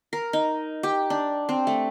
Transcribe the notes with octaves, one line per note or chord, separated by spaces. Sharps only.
A#4
D#4
G4
D4
C4
A3